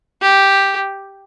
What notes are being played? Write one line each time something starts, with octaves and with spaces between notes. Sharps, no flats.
G4